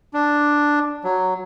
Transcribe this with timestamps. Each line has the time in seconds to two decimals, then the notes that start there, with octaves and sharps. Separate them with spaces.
0.14 D4
1.04 F#3